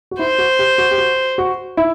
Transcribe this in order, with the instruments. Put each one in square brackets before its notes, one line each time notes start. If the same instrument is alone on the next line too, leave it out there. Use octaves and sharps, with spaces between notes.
[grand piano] F#4
[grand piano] E4 [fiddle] C5
[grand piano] F#4
G4
F#4
G4
F#4
F#4
E4